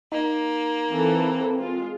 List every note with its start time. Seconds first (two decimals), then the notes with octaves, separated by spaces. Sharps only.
0.12 A#3 D#4
0.90 E3 C4 A4
1.59 G#3 F4